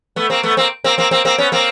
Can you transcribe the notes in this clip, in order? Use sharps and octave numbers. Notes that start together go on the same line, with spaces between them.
A3 B3
A#3 C4
A3 B3
A#3 C4
A#3 C4
A#3 C4
A#3 C4
A#3 C4
B3 C#4
A#3 C4